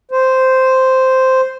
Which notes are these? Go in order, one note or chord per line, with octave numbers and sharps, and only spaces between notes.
C5